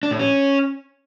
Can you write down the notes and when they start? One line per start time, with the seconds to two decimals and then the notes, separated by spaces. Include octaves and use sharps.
0.03 D4
0.11 A2
0.19 C#4